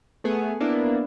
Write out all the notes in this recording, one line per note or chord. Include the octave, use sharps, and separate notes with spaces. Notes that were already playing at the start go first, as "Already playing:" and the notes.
A3 B3 G#4
A#3 B3 D4 E4